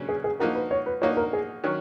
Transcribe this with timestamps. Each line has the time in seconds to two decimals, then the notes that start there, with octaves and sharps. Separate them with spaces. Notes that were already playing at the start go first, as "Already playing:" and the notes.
Already playing: C#3 F#3 A#3 C#4
0.09 G#4
0.24 G#4
0.39 F3 A#3 D#4 F#4 A#4
0.55 B4
0.71 C#5
0.86 B4
1.01 F3 A#3 D#4 F#4 C#5
1.17 A#4
1.33 G#4
1.64 D#3 F#3 C#4